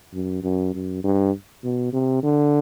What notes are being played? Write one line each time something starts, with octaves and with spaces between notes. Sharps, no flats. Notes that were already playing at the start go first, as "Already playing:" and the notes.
F#2
F#2
F#2
G2
B2
C3
D3